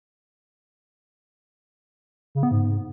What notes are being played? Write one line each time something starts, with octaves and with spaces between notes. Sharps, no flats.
C#3
B3
G#2